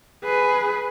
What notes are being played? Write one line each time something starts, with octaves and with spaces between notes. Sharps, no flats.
G#4 B4